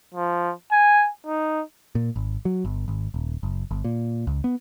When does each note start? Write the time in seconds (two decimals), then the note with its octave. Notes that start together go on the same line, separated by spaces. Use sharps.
0.14 F3
0.72 G#5
1.27 D#4
1.95 A#2
2.16 G#1
2.45 F#3
2.65 G1
2.88 G#1
3.14 D#1
3.43 F#1
3.71 G1
3.84 A#2
4.27 C#2
4.44 B3